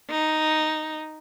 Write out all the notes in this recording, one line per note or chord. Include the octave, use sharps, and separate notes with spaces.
D#4